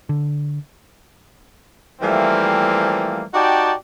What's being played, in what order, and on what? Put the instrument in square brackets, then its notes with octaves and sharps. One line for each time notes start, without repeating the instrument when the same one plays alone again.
[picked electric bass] D3
[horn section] E3 F3 G3 A3 A#3 C4
D#4 F#4 G4 D5 G5 A5